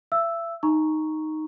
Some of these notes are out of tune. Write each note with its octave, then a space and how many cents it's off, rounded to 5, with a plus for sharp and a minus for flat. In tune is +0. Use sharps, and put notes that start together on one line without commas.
E5 +35 E6 +0
D#4 +0 A#5 +0 C#6 +0